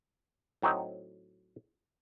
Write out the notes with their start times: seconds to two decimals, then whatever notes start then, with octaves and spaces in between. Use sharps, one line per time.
0.62 A2 F#3 C4 D#4